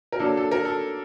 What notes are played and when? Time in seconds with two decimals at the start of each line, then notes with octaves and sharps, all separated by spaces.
0.12 A#4
0.19 F#3 A#3 D4 A4
0.37 A4
0.51 A#4
0.65 A4